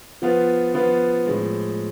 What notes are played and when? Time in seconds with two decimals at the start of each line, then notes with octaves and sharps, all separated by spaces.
0.22 F3 B3 F4 B4
0.74 F3 B3 F4 B4
1.26 A2 F3 G#3